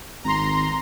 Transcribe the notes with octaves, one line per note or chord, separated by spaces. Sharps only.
G#1 A#5 C6